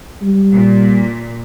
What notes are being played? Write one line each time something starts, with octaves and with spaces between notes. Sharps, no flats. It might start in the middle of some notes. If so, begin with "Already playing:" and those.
G3
A#2